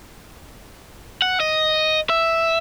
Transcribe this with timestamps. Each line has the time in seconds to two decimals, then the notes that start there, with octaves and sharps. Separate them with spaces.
1.22 F#5
1.40 D#5
2.10 E5